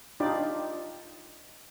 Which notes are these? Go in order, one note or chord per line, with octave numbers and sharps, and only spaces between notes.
D4 D#4 F4 G4 D5